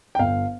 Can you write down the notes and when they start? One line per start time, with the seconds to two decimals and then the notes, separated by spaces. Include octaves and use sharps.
0.15 G5
0.19 G1 F5